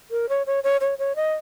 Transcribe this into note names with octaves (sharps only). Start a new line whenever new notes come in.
A#4
C#5
C#5
C#5
C#5
C#5
D#5